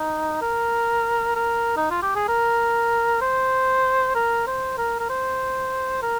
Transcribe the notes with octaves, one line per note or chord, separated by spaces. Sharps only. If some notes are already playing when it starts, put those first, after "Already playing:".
Already playing: D#4
A#4
A#4
D#4
F4
G4
G#4
A#4
C5
A#4
C5
A#4
A#4
C5
A#4